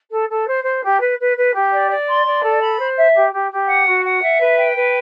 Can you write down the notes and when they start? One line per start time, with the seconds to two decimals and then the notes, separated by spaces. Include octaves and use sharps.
0.11 A4
0.28 A4
0.46 C5
0.64 C5
0.82 G4
1.00 B4
1.18 B4
1.36 B4
1.54 G4
1.72 D5
1.89 D5
2.07 C6
2.25 D5
2.43 A4
2.61 B5
2.79 C5
2.97 E5
3.15 G4
3.33 G4
3.51 G4
3.68 F#5
3.86 F#4
4.04 F#5
4.22 E5
4.40 B4
4.58 G5
4.76 B4